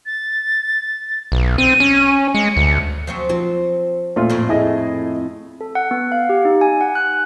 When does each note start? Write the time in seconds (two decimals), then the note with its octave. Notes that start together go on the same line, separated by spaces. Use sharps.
0.06 A6
1.32 B1
1.58 C4 D#7
1.80 C#4
2.34 G#3 C#7
2.57 D2
3.07 F3 F#3 C4
3.29 F3 C4
4.16 A#2 A3 F4
4.30 F2 A2
4.49 E4 G#4 D#5
5.61 A4
5.75 F#5
5.91 B3
6.12 F5
6.29 G4
6.45 D#4
6.61 G#5
6.81 F#5
6.95 F#6